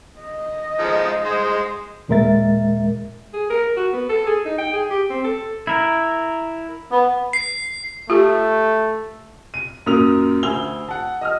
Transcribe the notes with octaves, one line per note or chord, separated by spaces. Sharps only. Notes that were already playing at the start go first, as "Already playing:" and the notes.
D#5
F3 G#3 D#4
G#3 C5
D#2 A#2 G#3 A#4 E5 A6
G#4
A#4
F#4
B3
A4
G#4
D#4
G5
G#4
G4
C4
A4
E4 A#4
B3
C7
A3 F4 G4
D#7
F#2 A#2 A#3 A#4 D#6 F7
D2 G#5 E6 F7 G7
F#5 A5
D#5 E6 F6